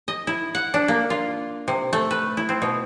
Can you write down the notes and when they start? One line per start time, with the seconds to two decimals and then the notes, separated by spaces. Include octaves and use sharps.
0.08 D#5
0.27 E4
0.55 F#5
0.74 D4
0.88 A#3
1.10 F4
1.68 C3
1.93 A3
2.11 B4
2.37 E4
2.49 C4
2.62 B2